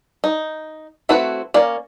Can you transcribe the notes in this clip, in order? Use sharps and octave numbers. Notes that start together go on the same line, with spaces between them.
D#4
A3 C4 E4 F#4 B4
A#3 C#4 D5